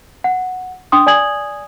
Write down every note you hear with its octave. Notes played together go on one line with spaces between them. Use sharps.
F#5
D4 G5 C6 D#6
D5 G#5 D#6 G#6 F#7